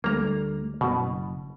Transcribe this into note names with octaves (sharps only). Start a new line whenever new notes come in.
D2 G3 A3 A#3 A#5
F#1 B2